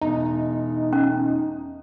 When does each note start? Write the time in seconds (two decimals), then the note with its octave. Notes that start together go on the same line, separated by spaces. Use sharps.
0.01 E1 D#4
0.93 C#4